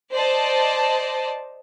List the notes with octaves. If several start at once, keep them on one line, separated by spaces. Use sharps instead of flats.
C5 D5 D#5 A5